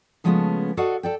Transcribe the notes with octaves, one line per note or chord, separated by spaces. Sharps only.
C#3 F3 G#3 A3 B3 C#4
F#4 A4 D5 D#5 F5 F#5
A4 D5 G5